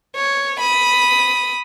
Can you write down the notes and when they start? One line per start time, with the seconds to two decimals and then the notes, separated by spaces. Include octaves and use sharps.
0.16 C#5
0.60 B5 D#6